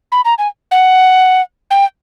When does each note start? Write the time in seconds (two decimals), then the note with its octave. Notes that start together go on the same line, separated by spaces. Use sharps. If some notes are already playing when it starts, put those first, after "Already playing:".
0.12 B5
0.25 A#5
0.38 G#5
0.71 F#5
1.71 G5